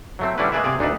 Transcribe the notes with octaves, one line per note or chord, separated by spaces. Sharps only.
F#3 A3 C4
D3 G3 C#4 D4 E4 B4
G#3 A#3 G#4 B4 D5 E5
C3 G#4 D5
D2 D4 D#4 A4 B4